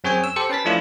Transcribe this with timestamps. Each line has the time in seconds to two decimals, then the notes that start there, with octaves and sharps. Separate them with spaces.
0.04 F#2 C4 G#4 C#5 G5 G#5
0.24 E6
0.36 G4 A4 C5 C#7
0.50 C#4 B4 A5 A6 B6
0.65 F3 A3 D4 E4 F4